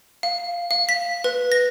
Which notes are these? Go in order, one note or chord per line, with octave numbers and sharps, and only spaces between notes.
F5
F5
B6
B4
A#6